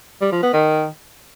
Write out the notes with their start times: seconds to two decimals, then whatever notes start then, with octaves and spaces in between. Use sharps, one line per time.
0.21 G3
0.32 F3
0.43 B3
0.53 D#3